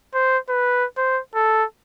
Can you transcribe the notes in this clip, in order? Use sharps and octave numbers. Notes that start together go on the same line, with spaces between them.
C5
B4
C5
A4